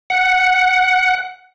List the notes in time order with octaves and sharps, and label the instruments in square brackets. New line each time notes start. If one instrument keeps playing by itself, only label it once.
[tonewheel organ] F#5